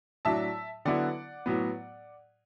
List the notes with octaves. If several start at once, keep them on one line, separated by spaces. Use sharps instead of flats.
A2 F#3 D4 E5 A5
D3 F#3 B3 E4 D5 F#5
A2 F#3 B3